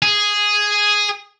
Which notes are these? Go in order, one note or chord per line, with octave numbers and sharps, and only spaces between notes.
G#4